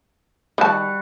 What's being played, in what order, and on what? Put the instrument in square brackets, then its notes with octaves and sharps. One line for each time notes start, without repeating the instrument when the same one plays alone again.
[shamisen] D#3 A5 [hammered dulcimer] G3 F#5 C#6